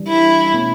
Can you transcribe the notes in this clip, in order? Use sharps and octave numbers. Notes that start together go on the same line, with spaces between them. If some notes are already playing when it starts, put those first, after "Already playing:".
Already playing: E3 G3 D4
E4
B2 A3 C#4 E4